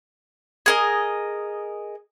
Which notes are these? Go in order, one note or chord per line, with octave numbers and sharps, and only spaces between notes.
G#4 A#4 D#5